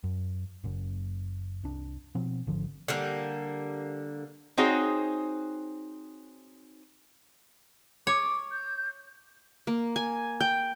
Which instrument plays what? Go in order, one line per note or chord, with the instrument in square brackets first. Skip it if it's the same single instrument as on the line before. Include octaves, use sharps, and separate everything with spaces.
[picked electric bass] F#2
F#1 F#2
C2 D4
B2 F3 B3 C4
G#1 D3 F3
[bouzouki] D3 G3 A#3
[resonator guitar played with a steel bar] C4 D#4 F#4 G#4 C5 C#5
[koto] C#5 [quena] D6
[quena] G6
[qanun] A#3
G#5
G5